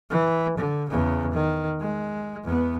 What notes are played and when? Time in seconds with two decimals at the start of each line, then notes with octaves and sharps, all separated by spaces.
0.10 E3
0.58 D3
0.89 E2 C#3
1.32 D#3
1.81 G#3
2.44 E2 B3